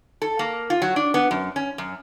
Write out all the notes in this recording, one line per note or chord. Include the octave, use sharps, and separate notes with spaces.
A4
A#3
F4
F#3
D4
B3
F#2
C#4
F#2